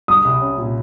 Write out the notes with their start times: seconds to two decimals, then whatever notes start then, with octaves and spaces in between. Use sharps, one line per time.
0.08 G3 D#6
0.25 C2
0.41 C#4
0.58 A#2